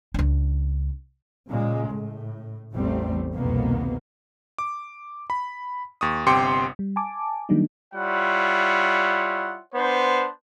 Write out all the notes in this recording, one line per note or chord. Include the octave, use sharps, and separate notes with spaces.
C#2 D4
A#2 C#3 G#3
A2
A1 E2 G3 A3 C4
C2 F2 B2 D#3 A#3 B3
D6
B5
D#2 C#6 D#6
G1 C3 G5 C6 D6 C#7
G3
G#5 A5 D6
D#3 F#3 G3 A#3 D4 D#4
G3 E4 F4 C#5 F#5
B3 D4 C5